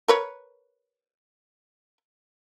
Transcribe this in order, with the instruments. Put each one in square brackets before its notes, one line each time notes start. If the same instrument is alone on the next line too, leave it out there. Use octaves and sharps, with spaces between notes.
[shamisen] A#4 B4 C#5